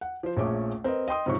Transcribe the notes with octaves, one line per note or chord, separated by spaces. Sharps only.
F#5
F3 C5
A#1 A#2 A3 C#4 G#4 D6
C4 A#4 B4 D#5
D#5 G5 C6 D#6
G#2 C3 F3 C#4 C#6